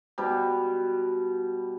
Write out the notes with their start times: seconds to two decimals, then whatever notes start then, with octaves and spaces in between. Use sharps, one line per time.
0.18 B2 G3